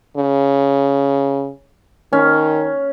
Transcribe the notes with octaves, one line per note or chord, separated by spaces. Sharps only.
C#3
D#3 C#4